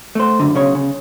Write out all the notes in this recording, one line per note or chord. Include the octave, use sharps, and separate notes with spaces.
A3 C5
C#2 F#2 D3
B1 C#3 C#5
C#3